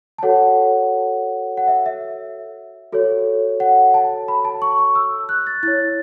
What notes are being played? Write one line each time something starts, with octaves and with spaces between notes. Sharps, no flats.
A5
F#4 A4 C#5 F#5
F#5
E5
E5
F#4 A4 C#5
F#5
A5
B5
A5
C#6
C#6
E6
F#6
A6
E4 C#5 A6